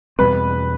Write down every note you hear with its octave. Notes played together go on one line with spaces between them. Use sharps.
E2 B2 G3 C4 B4